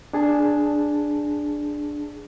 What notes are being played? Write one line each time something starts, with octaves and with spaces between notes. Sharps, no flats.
D4 G#4 A5